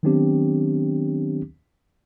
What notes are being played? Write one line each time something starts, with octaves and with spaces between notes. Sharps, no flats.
D#3 F#3 B3 C4 D4 G4